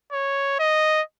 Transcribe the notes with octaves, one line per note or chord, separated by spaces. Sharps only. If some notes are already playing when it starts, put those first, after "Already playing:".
C#5
D#5